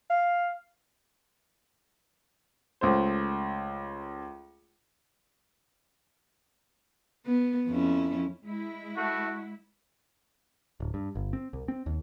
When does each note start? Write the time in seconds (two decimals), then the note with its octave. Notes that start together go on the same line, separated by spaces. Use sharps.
0.10 F5
2.81 C#2 A3 C5
7.26 B3
7.68 F2 C#4 E4
8.44 G#3 E4
8.97 A3 F#4
10.80 D1
10.94 G2
11.15 G1
11.33 C4
11.53 C2
11.68 C4
11.86 D#2